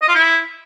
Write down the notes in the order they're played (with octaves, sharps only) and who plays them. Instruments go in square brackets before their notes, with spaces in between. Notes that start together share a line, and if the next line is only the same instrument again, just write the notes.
[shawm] D#5
F4
E4